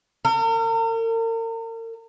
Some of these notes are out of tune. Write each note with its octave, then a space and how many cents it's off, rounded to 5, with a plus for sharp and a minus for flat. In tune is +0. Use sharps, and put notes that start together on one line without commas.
A#4 -40